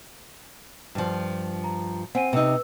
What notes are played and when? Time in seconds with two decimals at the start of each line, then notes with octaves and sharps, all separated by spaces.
0.95 G2 F3
1.64 A#5
2.15 C4 F#5 G#5 D#7
2.33 C3 D#4 B4 E6